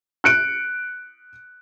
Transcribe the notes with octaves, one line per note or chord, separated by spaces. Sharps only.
F#6 C#7 D7